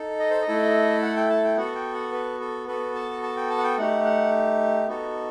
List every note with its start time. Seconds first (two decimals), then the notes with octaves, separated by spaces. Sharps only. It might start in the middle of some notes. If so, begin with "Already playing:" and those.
Already playing: D#4 A4
0.19 D#5
0.30 C5
0.41 D#5
0.47 A3 E4 A4
1.02 F#5
1.16 G5
1.30 A5
1.44 G5
1.57 B3 F#4 A4 F#5
1.75 G5
1.94 F#5
2.13 B4
2.40 A4
2.67 B3 F#4 A4 B4
2.95 A5
3.23 A5
3.37 G5
3.51 A5
3.58 F#5
3.64 G5
3.78 A3 D#4 G4 F#5
4.05 F#5
4.87 B3 D#4 F#4 A4